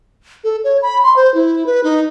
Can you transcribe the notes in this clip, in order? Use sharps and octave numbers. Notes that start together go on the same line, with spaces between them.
A4
C#5
B5
C6
C5
E4
B4
D#4